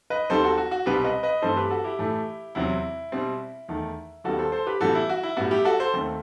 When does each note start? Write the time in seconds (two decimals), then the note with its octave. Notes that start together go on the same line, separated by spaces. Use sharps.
0.10 B4 D#5
0.30 D#2 D#3 G3 C4 A4 C5
0.43 F#4 A4
0.58 F#4
0.71 F#4
0.86 C2 B2 G3 C4 G4 B4
1.04 B4 D#5
1.23 B4 D#5
1.42 G2 E3 A3 C4 A4 C5
1.56 G4 B4
1.70 F#4 A4
1.84 E4 G4
1.99 A2 E3 A3
2.55 E2 C3 F#3 C4 E4
3.12 B2 G3 C4
3.69 E2 D#3 A3
4.24 D#2 D#3 G3 B3 F#4 A4
4.38 A4 C5
4.52 A4 C5
4.67 G4 B4
4.81 A2 E3 G3 B3 F#4 A4
4.95 E4
5.09 F#4
5.23 E4
5.37 A2 G3 B3 F#4
5.51 E4 G4
5.65 F#4 A4
5.79 A4 C5
5.93 D#2 D#3 A3 C4